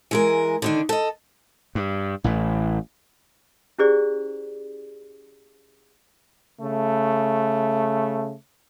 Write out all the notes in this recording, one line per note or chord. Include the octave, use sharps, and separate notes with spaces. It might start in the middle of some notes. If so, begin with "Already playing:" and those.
E3 G#3 A#4
D3 D#3 D4
A4 D#5
G2
A1 A2 E3
C#4 E4 G4 G#4 C5 D5
C#3 A3